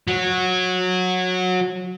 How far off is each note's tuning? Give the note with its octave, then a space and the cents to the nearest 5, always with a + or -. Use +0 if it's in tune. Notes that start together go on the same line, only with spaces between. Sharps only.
F#3 -15